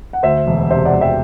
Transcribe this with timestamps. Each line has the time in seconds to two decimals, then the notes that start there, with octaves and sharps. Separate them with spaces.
0.13 F#5
0.23 D2 C5 E5
0.47 E1
0.70 C3 C5 E5
0.85 D5 F#5
0.94 E1
1.01 E5 G5